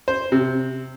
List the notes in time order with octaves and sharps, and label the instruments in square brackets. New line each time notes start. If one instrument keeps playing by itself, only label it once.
[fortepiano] C5
C3